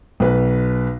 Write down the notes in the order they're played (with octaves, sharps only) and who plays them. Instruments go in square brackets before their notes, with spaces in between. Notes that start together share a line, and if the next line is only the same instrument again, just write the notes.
[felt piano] B1 B4